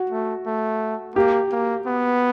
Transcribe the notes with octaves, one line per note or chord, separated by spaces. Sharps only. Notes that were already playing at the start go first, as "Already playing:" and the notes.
Already playing: F#4
A3
A3
A#3 G4
A#3
B3